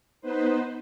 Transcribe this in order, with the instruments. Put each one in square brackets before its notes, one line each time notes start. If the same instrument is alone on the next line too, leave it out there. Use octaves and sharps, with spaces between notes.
[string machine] B3 D#4 B4 C5